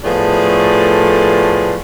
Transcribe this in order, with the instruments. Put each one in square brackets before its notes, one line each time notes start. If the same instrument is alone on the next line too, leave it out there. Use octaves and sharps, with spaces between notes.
[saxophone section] A2 F3 A3 B3 G#4 D5